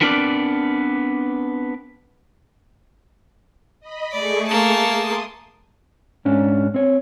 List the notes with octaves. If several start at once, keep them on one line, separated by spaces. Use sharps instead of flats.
B3 C4 D4 A#4 B4 D5
D#5 B5
A3 G#4 D5 C#6
A#3 A5
C6 D#6
G#2 C#4 D4
C4 C#5